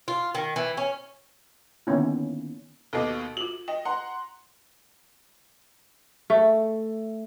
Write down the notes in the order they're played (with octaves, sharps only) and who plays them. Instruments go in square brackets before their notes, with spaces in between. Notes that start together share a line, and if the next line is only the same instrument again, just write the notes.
[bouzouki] F4
D#3
E3
C#4
[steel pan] D3 D#3 A#3 B3 C#4 E4
[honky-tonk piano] D#2 B2 [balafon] A4 D#5 D6
[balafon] F4 F#4 [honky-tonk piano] F#7
[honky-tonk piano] D#5 [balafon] G5
[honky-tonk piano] F#5 A#5 C6
[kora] A3